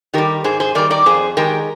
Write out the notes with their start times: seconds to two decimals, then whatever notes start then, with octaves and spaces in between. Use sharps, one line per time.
0.14 D#3 G3 G4 A#4
0.44 G#2 G#4 C5
0.60 G#4 C5
0.75 D#3 G3 A#4 D5
0.90 A#4 D5
1.06 F2 G#4 C5
1.37 D#3 G#3 G4 A#4